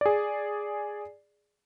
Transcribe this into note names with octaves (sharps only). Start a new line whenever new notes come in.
G#4 D5